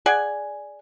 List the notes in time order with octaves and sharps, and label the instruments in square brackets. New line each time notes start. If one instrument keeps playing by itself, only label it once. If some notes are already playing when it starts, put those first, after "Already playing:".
[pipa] G#4 D5 F#5 G#5